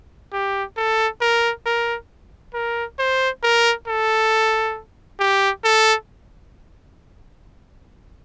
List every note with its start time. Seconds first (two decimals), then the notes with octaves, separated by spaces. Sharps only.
0.33 G4
0.77 A4
1.21 A#4
1.66 A#4
2.53 A#4
2.99 C5
3.43 A#4
3.87 A4
5.19 G4
5.64 A4